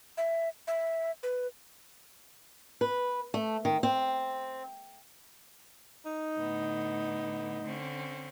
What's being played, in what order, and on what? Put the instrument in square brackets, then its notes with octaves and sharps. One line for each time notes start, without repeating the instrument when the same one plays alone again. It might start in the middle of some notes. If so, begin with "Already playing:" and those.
[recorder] E5
E5
B4
[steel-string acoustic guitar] B4
A3
D#3
C4
[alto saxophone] D#4
[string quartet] A2 D3 B3
D3 C4 C#4